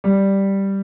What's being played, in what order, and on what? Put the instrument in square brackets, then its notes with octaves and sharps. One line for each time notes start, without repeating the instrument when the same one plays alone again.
[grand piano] G3